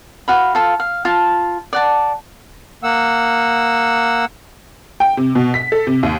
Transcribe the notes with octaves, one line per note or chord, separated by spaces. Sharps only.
F#4 F5 B5
F4 A4 F5
F5
F4 A5
D5 F#5 A5
A#3 F#5 E6
G5
C3
B2
B6
A4
C3
D#2